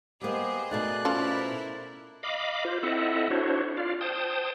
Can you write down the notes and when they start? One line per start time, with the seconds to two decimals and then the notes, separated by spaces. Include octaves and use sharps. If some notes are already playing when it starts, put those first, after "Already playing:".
0.21 G3 A#3 B3 G4 G#4 C5 D#5
0.71 B2 A3 D#4 D5 F#6
1.05 C#4 E4 F4 A4 A#4 C5
2.23 D#5 F5 B5 D6
2.65 F4 C5
2.83 C4 E4 A4 D#5 E5 F#5
3.30 D4 E4 F#4 C5 C#5
3.77 F4 D5 F5
4.01 C5 G5 A5 D#6